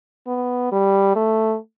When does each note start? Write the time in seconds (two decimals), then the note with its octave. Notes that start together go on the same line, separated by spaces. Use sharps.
0.27 B3
0.72 G3
1.16 A3